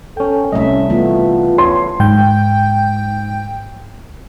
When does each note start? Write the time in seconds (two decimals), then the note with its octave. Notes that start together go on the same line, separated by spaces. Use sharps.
0.17 C#4 A4 G5
0.52 C2 G3 A3 C#4 D#5 E5
0.90 E3 A3 B3 F4
1.58 C#5 C6
2.00 G#2 G5 G6